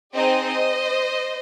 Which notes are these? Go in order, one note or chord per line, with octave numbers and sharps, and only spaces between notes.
C4 D#4 G#4 C5 D#5